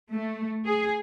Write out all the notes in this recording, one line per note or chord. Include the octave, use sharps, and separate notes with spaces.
A3
G#4